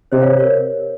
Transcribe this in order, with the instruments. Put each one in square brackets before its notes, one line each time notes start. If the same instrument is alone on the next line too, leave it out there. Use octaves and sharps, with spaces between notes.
[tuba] C3 [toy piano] C5 D#5
[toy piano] C#5 F5
A#4 C#5